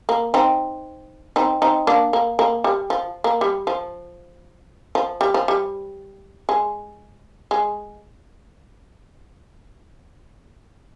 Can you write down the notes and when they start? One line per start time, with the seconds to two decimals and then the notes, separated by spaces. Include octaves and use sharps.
0.09 A#3
0.34 C4 D#4
1.36 C4 D#4
1.62 C4 D#4
1.87 A#3 D4
2.13 A#3
2.39 A#3
2.64 G3
2.90 F3
3.24 A#3
3.41 G3
3.67 F3
4.95 F3
5.21 G3
5.34 F3
5.48 G3
6.49 G#3
7.51 G#3